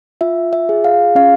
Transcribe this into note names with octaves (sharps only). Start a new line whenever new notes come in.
F4 E5
E5
G#4
F5
C#4 F5